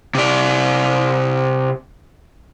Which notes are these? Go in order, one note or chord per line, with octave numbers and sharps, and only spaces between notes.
C3 D5